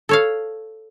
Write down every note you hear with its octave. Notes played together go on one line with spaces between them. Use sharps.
A4 C#5 F5